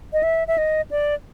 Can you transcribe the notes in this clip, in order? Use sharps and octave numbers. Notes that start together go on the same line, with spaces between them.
D#5
E5
E5
D#5
D5